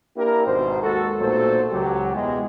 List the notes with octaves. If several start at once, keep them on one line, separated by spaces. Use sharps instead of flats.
A#3 D4 E4 G4 A#4
G#1 B2 C5
D#2 G#3 F#4 A4
B1 A#2 F#3 A3 A4 C5
C#2 F#3 G4
E2 B2 E3 G#3